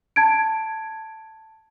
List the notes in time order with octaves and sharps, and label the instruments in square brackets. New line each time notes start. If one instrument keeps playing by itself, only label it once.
[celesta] A5 G#6 D7